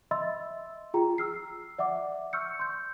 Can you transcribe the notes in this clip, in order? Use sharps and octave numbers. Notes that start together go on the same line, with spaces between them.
D#5 E5 B5 C6 E6 A6
F4 G#4 G5 A#5
E6 F6 C7
D5 E5 F#5 D6
C#6 E6 F6 G6 C#7
C6 G6